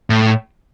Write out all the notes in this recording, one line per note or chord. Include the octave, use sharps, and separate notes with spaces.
A2